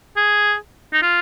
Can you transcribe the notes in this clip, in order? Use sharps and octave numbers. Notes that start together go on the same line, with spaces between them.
G#4
D#4
F4